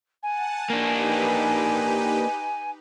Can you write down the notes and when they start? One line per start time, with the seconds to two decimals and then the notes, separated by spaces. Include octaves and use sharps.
0.23 F#5 G#5 A5
0.70 A#3 D4 D#4 G4 B4